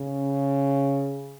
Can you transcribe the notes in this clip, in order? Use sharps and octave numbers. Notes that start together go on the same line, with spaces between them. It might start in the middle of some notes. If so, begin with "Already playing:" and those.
Already playing: C#3